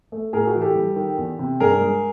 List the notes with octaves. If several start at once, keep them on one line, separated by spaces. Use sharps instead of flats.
A3
A2 G#4 A#4
F#4 G#4
E3
G4 A4
G3
D#3
E2
C3
G2 G#4 A#4
G#3